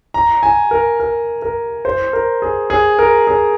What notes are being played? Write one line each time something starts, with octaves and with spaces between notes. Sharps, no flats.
A#5
G#5
A#4
A#4
A#4
C5
A#4
G#4
G#4
A#4
G#4